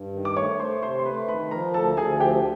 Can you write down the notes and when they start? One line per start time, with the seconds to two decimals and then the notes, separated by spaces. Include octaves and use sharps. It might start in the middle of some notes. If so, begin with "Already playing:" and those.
Already playing: G2
0.13 D#3
0.25 D6
0.37 A3 C#5 C#6
0.59 A3 C5 C6
0.82 C3 C5 C6
0.99 C6
1.05 A3 B4 B5
1.28 D#3 B4 B5
1.51 F3 A#4 A#5
1.74 D2 A4 A5
1.97 D2 G#4 G#5
2.20 F3 G4 G5